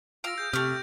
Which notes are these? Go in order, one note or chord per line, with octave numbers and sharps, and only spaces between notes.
F4 F5 E6 A#6 D7
G#4 G6
C3 A3 G4 F6